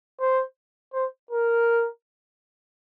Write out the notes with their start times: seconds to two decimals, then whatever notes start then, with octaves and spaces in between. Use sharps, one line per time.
0.20 C5
0.94 C5
1.31 A#4